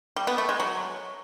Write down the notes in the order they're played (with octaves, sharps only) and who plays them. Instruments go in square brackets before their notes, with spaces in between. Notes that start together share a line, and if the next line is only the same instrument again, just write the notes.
[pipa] G3
B3
A3
G#3
F#3